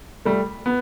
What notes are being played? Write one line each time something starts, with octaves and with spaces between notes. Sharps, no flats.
G3 A3
B3